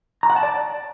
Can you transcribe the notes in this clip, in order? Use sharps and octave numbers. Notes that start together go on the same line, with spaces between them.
A#5
F#5
A5
D5